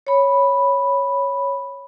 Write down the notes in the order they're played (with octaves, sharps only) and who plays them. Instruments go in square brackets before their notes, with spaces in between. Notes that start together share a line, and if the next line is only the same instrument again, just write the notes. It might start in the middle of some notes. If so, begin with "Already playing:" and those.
[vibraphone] C#5 B5